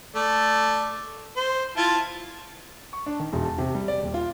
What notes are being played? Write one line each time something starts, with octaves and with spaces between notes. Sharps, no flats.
A3 D5
C5
E4 F4 A5
C#6
D4
D#3
E1
A5
C3
G3
D5
D#1
F4